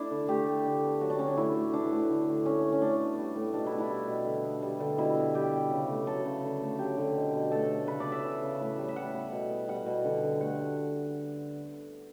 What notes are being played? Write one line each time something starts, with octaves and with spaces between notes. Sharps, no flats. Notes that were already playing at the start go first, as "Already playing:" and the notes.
Already playing: A3 D4 E4
D3
A3 G4
A3
D3
B3
F#3 F#4
D4
D3 C#4
D4
A2 E4
A3
E3 D4
A2
D3
D3
A3 C#4
A3
C#4
A2 D4
B3
G3
A2
B2 D4
E4
B3
E4
G3
B2
D3
B3
G3
D3
B2 E4
B3
G3 G4
B2
C#3
A3
F#3 A4
C#3
D3
A3
F#3 G4
D3
B2
B2
A3 A4
A3
C#3 B4
D5
B3
E5
E3
C#3
A2
G3
E5
E3 F#5
B3
B2
B3
G3 F#5
B2
D3
D3
A3 F#5